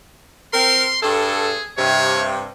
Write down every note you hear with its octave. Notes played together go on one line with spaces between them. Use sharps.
C4 A#4 C6
G2 G#4 A4
G2 C3 C#5